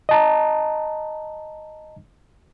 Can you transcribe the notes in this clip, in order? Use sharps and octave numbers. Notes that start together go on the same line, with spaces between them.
D#5 A5 A#5